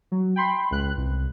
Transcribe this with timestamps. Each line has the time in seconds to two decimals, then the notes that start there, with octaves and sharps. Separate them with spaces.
0.12 F#3
0.36 G5 B5 C6
0.71 C#2 F#6
0.97 C2